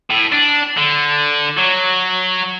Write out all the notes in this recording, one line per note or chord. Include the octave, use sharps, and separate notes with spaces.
A2
D4
D3
F#3